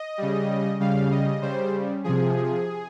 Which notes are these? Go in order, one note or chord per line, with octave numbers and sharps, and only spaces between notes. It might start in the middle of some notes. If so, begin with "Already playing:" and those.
Already playing: D#5
C#3 G3
C#3 G3 F5
D#5
C#3 G3 C5
C3 F3 G#4